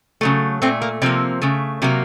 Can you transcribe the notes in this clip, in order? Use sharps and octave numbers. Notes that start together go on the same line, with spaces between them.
C#3 F#3 A3
A#2 A3 C4
A#3
C3 F3 A#3 C4
C#3 A3
C3 F#3 A#3